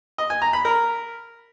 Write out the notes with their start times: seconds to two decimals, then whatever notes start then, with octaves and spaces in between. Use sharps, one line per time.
0.18 D#5
0.30 G#5
0.42 A#5
0.53 B5
0.65 A#4